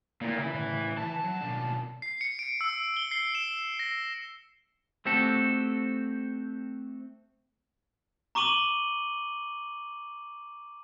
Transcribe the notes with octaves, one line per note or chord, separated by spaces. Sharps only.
A#2 A#3 E4
C#3 E3 E4
A2 C#3
E3 A5
F#3
B1 D4
C7
C#7
D7
E6
G7
C7
E7
A#6
A3 C4 F#4 G4 A4
A#5 C#6 D6 D#7 F#7 G7